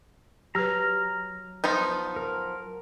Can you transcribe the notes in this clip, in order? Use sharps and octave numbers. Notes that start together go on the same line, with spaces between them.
F#3 G4 B4 A#5 F6
F3 B3 D#4
A#4